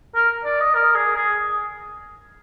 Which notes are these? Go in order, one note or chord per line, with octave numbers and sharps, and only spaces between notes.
A#4
D5
D#5
A#4
G#4
G#4